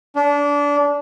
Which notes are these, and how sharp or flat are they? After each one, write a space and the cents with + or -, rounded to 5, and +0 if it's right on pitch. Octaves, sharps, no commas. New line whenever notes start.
D4 -25